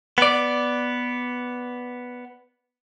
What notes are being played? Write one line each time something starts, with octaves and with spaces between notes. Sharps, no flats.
B3 D5